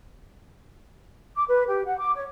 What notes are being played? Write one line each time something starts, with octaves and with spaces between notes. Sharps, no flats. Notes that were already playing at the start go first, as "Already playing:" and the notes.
D6
B4
G4
F#5
D6
C#5